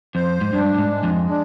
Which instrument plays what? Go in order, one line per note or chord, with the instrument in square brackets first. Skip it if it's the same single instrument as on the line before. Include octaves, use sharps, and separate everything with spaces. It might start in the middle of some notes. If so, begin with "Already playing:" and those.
[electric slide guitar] F2 [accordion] C5
[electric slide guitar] G#2
[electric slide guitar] G2 [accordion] D4
[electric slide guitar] G2
G#2
[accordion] G#3
[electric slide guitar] F2
[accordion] D4